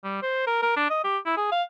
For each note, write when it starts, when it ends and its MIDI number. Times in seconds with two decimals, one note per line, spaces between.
0.04 0.20 55
0.22 0.44 72
0.47 0.61 70
0.62 0.76 70
0.76 0.89 62
0.90 1.01 75
1.04 1.18 67
1.26 1.37 64
1.37 1.49 68
1.52 1.63 77